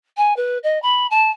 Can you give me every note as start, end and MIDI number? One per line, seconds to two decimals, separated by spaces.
0.17 0.35 80
0.36 0.58 71
0.63 0.80 75
0.82 1.07 83
1.11 1.31 81